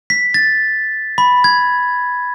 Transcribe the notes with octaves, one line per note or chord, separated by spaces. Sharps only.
B6
A6
B5
G#6